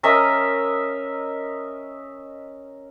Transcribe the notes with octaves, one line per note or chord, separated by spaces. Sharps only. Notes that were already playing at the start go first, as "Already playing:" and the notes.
C#4 A#4 D#5 E5